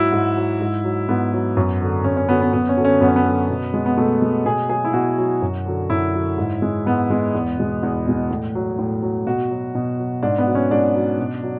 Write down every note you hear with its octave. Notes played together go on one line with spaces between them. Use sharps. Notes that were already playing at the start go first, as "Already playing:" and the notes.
Already playing: G#2 F#3 E4 F#4
G#2
F#3
G#2
F#3
G#2 B3
F#3
F#2
D3 F#3
F#2 C#4
C#4
D3 F#3 B3
B3
F#2 B3
C#4
D3 F#3
C#4
F#2 B3
C#4
B3
D3 F#3
B2
G#3
B3
B2 A3
G#3
B2 G#4
F#3 G#4
E4
B2 F#4
F#3
F#2
D3 F#3
F#2 E4
D3 F#3
G#2
G#3
G#2 B3
G#3
E2
B2 G#3
E2
B2 G#3
A2
F#3
A2
F#3
B2 F#4
F#3
B2
F#3
G#2 D4
B3
F#3
C#4
G#2 D4
F#3
B2
F#3